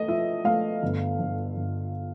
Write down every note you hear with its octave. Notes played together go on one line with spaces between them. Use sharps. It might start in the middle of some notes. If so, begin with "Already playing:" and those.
Already playing: A3 D#5
F3 E5
A3 F5
G1
G1
G1